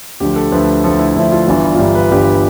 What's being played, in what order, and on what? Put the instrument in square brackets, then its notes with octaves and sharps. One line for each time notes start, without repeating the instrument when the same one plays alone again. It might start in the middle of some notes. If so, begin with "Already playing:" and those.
[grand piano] D2 D3 F3 G4
A4
D2 D3 F3 B4
D2 D3 F3 A4
E4
D2 D3 F3 E4
F4
G1 G2 E3 F4
F4
G1 G2 E3 G4
B4
G1 G2 E3 G4